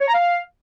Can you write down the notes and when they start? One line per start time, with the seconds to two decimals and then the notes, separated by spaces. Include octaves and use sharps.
0.01 C#5
0.08 A#5
0.14 F5